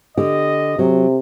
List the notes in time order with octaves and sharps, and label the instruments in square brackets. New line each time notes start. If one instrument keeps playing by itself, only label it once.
[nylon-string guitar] D3 G4 [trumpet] D#5
[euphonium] C3 [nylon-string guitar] F#3